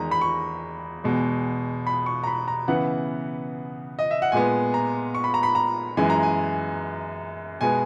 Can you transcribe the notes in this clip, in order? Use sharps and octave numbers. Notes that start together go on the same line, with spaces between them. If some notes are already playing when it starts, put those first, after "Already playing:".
Already playing: E2 D#3 G#3 A#5
B5
C#6
E2 B2 G#3
B5
C#6
A#5
B5
A#5
C#3 E3 B3 F#5
D#5
E5
F#5
A#2 G#3 B3 G#5
A#5
C#6
B5
A#5
B5
A#5
F#2 E3 G#3 G#5
A#5
G#5
B2 G#3 B3 G#5